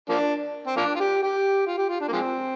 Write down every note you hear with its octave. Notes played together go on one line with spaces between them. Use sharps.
F3 A#3 D4
C4
F3 A#3 D4
F4
G4
G4
F4
G4
F4
D4
A#3
F3 G#3 C4